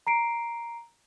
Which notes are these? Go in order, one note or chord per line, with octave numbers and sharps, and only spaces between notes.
A#5 C7 D7